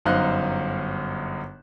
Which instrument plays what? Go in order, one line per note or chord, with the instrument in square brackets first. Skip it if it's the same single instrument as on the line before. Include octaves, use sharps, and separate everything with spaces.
[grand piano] G1 F#2 D#4 C5 F5 F#6